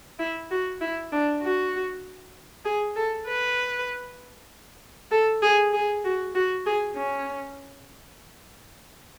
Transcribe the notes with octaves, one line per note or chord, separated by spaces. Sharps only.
E4
F#4
E4
D4
F#4
G#4
A4
B4
A4
G#4
G#4
F#4
F#4
G#4
C#4